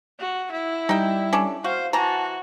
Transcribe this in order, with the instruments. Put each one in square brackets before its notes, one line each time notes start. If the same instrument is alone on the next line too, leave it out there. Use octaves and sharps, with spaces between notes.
[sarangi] F#4
E4
[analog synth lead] G3 [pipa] D#4 G5
[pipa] C#4 D4 A4
[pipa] F#4 [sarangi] C5 [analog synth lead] F5
[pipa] E3 A#5 [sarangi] F#4 [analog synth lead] A5